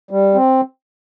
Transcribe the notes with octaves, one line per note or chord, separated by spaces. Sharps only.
G3
C4